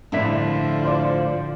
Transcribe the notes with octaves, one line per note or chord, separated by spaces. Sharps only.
A2 D3 F3 D4 E4 E5
F4 C5 D5